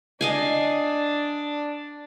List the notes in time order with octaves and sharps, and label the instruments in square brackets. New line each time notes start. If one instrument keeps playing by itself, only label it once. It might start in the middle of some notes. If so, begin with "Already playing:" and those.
[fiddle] D4 [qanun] D#5 F5 G#5